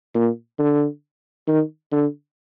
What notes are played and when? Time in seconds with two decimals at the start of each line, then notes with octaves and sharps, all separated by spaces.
0.15 A#2
0.59 D3
1.48 D#3
1.92 D3